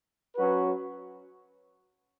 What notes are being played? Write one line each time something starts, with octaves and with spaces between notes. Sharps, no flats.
F#3 C#4 F#4 B4